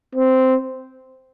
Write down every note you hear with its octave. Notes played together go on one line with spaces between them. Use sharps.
C4